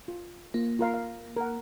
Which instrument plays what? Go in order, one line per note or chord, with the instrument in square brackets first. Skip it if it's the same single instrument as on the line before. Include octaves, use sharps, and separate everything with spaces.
[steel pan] F4
[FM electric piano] A#3 [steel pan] F4
[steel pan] F4 A#4 F5
F5
A#4 F#5